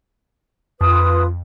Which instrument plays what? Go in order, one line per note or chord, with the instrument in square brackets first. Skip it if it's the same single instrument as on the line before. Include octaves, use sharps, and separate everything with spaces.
[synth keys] F2 [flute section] F4 B4 D#6